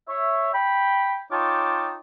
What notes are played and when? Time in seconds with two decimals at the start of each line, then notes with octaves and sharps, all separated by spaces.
0.08 C#5 E5
0.53 G5 B5
1.32 D#4 F4 C#5 G5 A5 D6